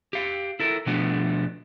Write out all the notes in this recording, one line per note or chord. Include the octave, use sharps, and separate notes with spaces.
G4 F5
E4 A4 A#4
B2 F3 A3 B3 D4 F#4